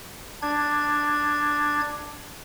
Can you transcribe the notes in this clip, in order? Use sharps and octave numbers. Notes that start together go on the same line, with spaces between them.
D4 G#6